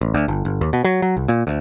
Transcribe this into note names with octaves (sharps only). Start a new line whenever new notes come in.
A1
D2
G1
G1
D#2
B2
F#3
F#3
C2
A#2
D2